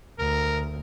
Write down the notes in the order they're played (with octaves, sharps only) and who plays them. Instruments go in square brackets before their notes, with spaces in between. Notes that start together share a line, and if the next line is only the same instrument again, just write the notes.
[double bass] D2 [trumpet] A#4